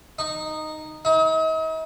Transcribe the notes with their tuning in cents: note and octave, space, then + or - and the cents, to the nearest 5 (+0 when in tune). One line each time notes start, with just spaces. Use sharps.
D#4 -10
D#4 +40